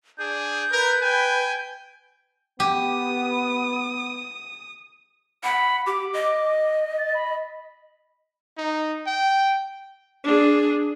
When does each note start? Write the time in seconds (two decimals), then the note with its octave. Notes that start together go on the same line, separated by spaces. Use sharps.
0.18 D4 G#4 G6
0.72 A#4 B4
1.03 G5 G#5
2.60 B3 G4 D#6
5.44 F#5 B5
5.86 G4 D6
6.13 D#5
6.98 A6
7.14 B5
8.58 D#4
9.07 G5
10.24 D4 G#4